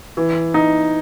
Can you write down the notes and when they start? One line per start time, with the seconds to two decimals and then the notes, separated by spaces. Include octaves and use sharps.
0.17 E3
0.54 D#4